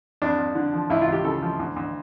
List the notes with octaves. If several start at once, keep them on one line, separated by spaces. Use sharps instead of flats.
F2 D4
F2
D3
F3
C#2 E4
F4
C#2
G4
C#3 A4
F3
D2
D2